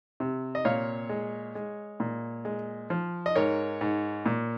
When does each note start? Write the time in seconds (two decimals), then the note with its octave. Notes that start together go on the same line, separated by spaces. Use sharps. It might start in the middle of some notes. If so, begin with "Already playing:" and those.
0.20 C3
0.55 D#5
0.65 A#2 C#5 F5
1.09 G#3
1.55 G#3
2.00 A#2
2.45 G#3
2.90 F3
3.26 D#5
3.36 G#2 A#4 C#5
3.81 G#2
4.26 A#2